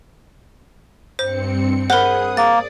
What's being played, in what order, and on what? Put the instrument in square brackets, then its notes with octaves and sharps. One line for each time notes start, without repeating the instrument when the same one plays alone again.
[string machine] G2 C4 C#7 [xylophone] C5
[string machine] G#4 D#6 [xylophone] A#4 C5 [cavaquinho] F#5 B5
[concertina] A#3 [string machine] D5 [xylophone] A6